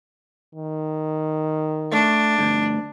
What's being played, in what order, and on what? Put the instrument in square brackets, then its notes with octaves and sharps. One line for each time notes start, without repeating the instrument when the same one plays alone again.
[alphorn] D#3
[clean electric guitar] A3 [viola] D4
[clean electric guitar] D2 G2